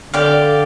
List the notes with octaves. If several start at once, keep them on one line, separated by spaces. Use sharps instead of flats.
D3 G4 D5 F5